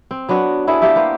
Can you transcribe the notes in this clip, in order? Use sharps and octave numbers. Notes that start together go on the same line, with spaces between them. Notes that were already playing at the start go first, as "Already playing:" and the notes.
C4
F#3 B3 D4 F#4
B3 E4 G#4 A4
A3 A#3 G4 E5
A#3 B3 C5